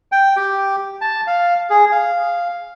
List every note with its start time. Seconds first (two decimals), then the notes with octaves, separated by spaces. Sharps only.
0.12 G5
0.37 G4
1.01 A5
1.27 F5
1.70 G#4
1.92 F5